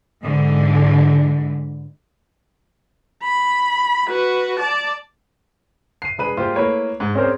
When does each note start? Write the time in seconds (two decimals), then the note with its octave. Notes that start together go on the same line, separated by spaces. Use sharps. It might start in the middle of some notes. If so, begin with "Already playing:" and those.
0.24 G#2 D3 E3
3.23 B5
4.08 F#4 B4
4.59 D5 A5
6.02 C7 D#7
6.18 E1 G#4 B4 D#7
6.37 G3 G#3 A#3 F4 G4 C5
6.56 A3 A#3 E4 A#4 B4 C#5
7.00 G#2
7.15 C4 C#4 G#4 A#4 C5 D5